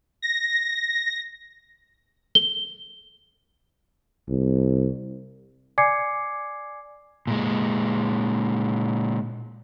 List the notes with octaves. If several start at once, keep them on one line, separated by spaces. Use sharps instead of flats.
A#6
G7
C2
D5 G#5 D6 G#6 C7 C#7
A#2 G#3